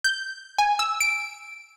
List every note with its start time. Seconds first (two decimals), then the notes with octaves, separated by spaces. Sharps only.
0.04 G6
0.58 G#5
0.79 E6
1.00 D7